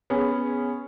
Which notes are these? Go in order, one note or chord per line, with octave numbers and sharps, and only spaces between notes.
B3 C#4 G#4